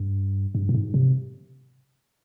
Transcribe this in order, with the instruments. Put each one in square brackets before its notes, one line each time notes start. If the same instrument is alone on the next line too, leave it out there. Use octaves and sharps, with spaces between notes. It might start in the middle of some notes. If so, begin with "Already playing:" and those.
Already playing: [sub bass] G2
G2
A#2
G#2
C3